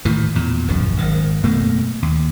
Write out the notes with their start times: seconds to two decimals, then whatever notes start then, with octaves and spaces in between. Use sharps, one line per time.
0.05 A2 D#3 E3
0.35 E2 A#2
0.67 D1 A#1 F#2 F3
0.98 G#1 D#3
1.43 F#1 B2 A3 A#3
2.02 D#2